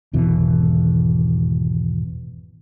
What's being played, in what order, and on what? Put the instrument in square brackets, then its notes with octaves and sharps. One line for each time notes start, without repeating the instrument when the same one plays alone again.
[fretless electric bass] G#1 E2 B2 E3